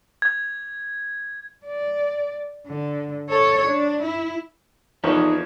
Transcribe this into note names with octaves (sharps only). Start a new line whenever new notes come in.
G#6
D5
D3
A4 C#5
D4
E4
E2 F3 D#4 A4 B4 C#5